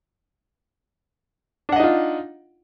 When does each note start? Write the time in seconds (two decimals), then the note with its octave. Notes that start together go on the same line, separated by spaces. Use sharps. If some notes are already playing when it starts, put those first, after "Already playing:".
1.69 D4
1.72 F#5
1.76 D#5
1.80 D#4
1.83 F4